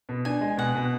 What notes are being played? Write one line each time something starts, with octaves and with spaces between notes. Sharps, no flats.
B2
D4 G#5
G#3
B2 F#5
B2